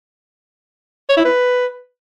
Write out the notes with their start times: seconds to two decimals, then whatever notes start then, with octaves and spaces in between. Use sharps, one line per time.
1.09 C#5
1.17 E4
1.25 B4